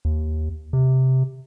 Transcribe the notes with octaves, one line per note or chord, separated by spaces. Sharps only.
D#2
C3